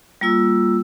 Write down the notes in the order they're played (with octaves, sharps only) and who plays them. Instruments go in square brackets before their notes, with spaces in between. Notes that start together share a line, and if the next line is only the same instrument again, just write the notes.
[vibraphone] G3 A#3 F4 E6